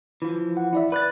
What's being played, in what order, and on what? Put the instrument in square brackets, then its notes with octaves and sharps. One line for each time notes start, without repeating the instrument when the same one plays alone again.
[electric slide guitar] E3 F3
[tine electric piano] F#5
E4 D5 E5
[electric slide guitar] B4 [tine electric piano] D5 F#6 A6